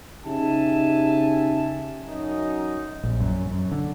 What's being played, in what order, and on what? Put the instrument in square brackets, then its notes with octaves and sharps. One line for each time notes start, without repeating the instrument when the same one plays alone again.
[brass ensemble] C#3 D#4 G4 E5 G#5 A5
F#2 D#4
[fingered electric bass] A#1
F#2
F#2
D3